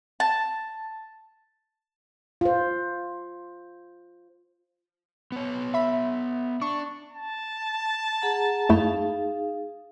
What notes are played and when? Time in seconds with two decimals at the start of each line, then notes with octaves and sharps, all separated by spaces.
0.20 A5
2.41 F4 C5
5.32 B3 C#5
5.74 E5 B5
6.62 D4 C#6
7.13 A5
8.22 G#4 F#5 A#5
8.69 F#2 A3 D#4 E4 G#4 F5